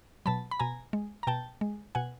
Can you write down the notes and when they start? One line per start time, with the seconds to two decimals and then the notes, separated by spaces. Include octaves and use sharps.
0.26 B2 F#3 A5 B5
0.51 B5
0.59 B2 G#5 A#5
0.93 G#3
1.23 A#5
1.27 B2 G5 A5
1.61 G#3
1.95 B2 F#5 G#5